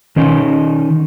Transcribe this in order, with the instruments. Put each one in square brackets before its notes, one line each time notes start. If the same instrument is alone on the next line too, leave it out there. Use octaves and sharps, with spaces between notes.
[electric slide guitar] D#3 C#4 D#4 D#5